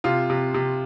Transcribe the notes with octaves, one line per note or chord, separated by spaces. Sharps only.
C3 F4
C3
C3